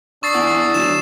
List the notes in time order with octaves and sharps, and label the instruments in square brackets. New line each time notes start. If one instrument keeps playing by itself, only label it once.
[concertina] D4 D#6 E6 [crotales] C#6 A6 C7
[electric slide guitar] B3 E4 F#5
[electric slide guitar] D3 F#3 [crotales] E7